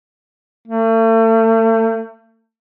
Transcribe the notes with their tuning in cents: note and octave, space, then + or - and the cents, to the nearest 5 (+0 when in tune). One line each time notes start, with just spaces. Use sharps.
A3 +40